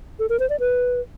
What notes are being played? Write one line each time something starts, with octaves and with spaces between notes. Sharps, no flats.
A4
A#4
C5
D5
B4